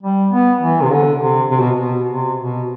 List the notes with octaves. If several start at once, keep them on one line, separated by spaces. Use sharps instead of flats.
G3
B3
E3
C3
D3
C3
C3
B2
B2
C3
B2